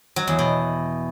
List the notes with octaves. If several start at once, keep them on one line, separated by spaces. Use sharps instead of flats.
F#3
E2
B2